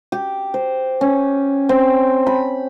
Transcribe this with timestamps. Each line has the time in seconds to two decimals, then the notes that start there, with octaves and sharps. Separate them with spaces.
0.12 G4
0.54 C5
1.01 C#4
1.69 C4
2.27 B5